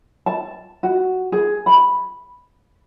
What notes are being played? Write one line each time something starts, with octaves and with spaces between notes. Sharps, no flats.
A5
F#4
G#4
B5